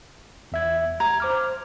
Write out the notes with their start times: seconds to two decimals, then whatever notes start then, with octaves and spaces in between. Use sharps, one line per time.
0.52 E2 E5 G#6
1.00 A#5 G#6
1.20 C5 D6 F6